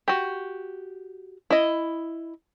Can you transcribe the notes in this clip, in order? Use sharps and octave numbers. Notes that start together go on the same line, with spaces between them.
F#4 G4
E4 D#5